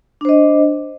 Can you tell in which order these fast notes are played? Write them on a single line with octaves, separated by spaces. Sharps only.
D4 C5 D#5